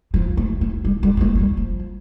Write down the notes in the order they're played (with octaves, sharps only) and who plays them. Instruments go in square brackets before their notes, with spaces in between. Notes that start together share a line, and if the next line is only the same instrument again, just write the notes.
[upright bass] F3
A3
A3
G3
G3
G3
A3
A3
G3
F3